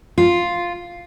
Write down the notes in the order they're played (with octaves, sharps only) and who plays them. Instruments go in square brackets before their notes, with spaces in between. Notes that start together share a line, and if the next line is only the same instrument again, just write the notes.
[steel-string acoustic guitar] F4